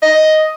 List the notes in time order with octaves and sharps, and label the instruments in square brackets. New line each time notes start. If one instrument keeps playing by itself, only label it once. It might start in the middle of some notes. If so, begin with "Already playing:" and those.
[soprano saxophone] D#5